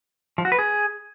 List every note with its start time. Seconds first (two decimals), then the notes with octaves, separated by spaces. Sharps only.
0.38 F3
0.45 F#4
0.52 B4
0.59 G#4